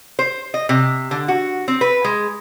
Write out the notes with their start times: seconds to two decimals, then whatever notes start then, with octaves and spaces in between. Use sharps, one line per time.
0.19 C5
0.54 D#5
0.69 C3
1.11 D3
1.28 F#4
1.68 C4
1.81 B4
2.05 G#3